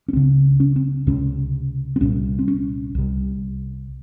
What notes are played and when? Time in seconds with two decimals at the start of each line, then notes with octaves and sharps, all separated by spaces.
0.08 C#4
0.13 C#2 C#3 C4
0.60 C#4
0.76 C4
1.07 C#2 C3 C#4
1.96 C4
2.01 C2 A#2 C#4
2.39 C4
2.48 C#4
2.95 C2 C3